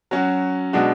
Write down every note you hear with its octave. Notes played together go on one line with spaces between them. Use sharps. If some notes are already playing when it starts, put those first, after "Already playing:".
F#3 C#4 F#4
B2 G#3 D4 F#4